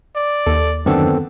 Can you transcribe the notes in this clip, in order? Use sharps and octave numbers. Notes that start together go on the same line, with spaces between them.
D5
D#2 A4
F#2 D3 D#3 B3 C4 D4 A4